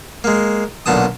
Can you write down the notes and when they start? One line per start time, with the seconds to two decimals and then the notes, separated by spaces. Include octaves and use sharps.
0.24 G#3 A#3
0.86 B1 A#2 D3 A5 D#6